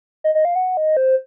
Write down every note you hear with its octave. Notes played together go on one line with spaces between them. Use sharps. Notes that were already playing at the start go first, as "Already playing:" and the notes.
D#5
D#5
F5
F#5
D#5
C5